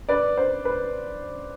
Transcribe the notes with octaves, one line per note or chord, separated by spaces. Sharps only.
B4 D5
C5
B4